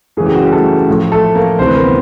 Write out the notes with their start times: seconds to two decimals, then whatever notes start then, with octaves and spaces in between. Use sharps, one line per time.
0.17 F#2 C#3 E3 G#4
0.26 G4
0.34 F#4
0.43 G3 G4
0.52 A3 A4
0.88 A2 F3
1.12 A3 A4
1.35 A#3 A#4
1.59 D2 C3 E3 G3 C5
1.68 B4
1.76 A#4
1.85 B3 B4